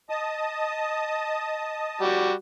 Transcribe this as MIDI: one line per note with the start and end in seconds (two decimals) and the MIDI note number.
0.10 2.02 75
0.10 2.02 81
0.10 2.02 87
2.01 2.31 55
2.01 2.31 66